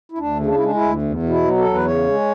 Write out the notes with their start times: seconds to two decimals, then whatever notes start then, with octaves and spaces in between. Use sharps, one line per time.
0.12 E4
0.18 D2 D4
0.39 C#3
0.46 D4
0.55 E4
0.60 G#3 D4
0.74 E4
0.81 D2
1.02 E2
1.23 B2
1.30 E4
1.44 F#3
1.58 A4
1.64 E2
1.74 B4
1.85 C#3 C#5
2.06 G#3